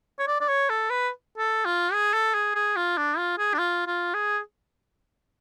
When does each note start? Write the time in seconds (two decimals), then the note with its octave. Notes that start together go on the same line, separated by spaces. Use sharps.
0.19 C#5
0.27 D5
0.40 D5
0.49 C#5
0.69 A4
0.90 B4
1.38 A4
1.65 F4
1.93 G#4
2.13 A4
2.34 G#4
2.55 G#4
2.76 F4
2.97 D4
3.17 F4
3.38 G#4
3.54 D4
3.59 F4
3.86 F4
4.14 G#4